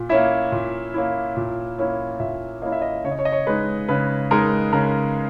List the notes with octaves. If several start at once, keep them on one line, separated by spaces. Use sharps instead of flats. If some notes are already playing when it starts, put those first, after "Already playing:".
Already playing: A#2
A#3 C#4 E4 E5
A#2
A#3 C#4 E4
A#2
A#3 C#4 E4
A#2 E5
A#3 C#4 E4 D#5
E5
D#5
C#3 C#5
D#5
C#5
D#5
C#5
G#3 D#4 B4
C#3 B4
G#3 D#4 A#4
C#3 A#4